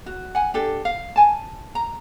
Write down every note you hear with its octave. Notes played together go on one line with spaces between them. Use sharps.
F#4
F#5 G#5
D4 G4 A4
F5
G#5 A5
A#5